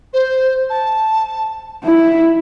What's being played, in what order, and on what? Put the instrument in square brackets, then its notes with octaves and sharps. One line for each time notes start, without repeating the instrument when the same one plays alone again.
[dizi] C5
A5
[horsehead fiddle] E4 [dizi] E5